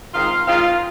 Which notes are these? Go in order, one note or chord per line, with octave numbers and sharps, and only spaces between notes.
D#3 G#3 C4 D#4 F4 F5
D#3 G#3 C4 D#4 F4 F5